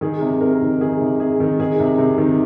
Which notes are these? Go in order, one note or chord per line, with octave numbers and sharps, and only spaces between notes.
D#3 G#4
C3
C3 A#4
D#3
D#3 G#4
C3
C3 G#4
D#3
D#3 G#4
C3
C3
D#3